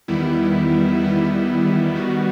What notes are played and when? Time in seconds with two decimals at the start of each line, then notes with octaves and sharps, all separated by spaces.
0.08 E2 D#3 G3 B3 E4
1.01 E2 D#3 G3 B3 E4
1.95 D#3 G3 B3 F#4